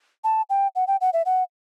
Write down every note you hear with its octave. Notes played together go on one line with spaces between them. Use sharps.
A5
G5
F#5
G5
F#5
E5
F#5